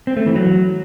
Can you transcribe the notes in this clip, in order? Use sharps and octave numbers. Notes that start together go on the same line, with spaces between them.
C4
A3
E3
F#3